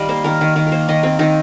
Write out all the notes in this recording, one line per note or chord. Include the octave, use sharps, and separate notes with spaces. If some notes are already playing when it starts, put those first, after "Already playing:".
Already playing: D#3 G3 D#5 F5
A#3 C5
D#3 A#4
D#3
D#3
A#4
A#3 C5
D#3 D#5
A#3 C4
D#3 D#4